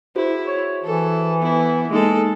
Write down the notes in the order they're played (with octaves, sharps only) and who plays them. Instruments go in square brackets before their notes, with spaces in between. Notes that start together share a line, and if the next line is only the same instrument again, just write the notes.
[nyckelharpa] E4 [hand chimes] F#4 G#4 C5
[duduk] C#5
[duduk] E3 [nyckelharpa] A4
[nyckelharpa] B3 E4
[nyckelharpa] G#3 A4 [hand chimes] A#3 D#4